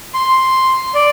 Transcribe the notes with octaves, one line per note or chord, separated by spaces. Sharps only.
C6
D5